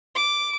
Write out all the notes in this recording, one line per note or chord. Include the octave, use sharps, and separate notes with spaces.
D6